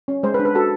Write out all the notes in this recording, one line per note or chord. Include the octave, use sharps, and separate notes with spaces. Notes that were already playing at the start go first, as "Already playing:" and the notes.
C#4
G#3 C5
B4
D4
B4
F#4 A4